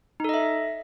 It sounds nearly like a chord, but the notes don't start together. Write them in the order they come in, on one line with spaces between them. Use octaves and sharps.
D#4 A4 D#5 E5